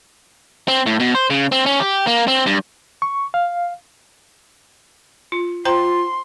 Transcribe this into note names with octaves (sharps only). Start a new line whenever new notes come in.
C4
A2
B2
C5
C#3
C4
C#4
G4
A#3
C4
G2
C#6
F5
F4
F4 C5 G5 A#5 C6